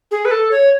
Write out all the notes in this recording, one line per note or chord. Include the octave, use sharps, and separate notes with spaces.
G#4
B4
A4
C#5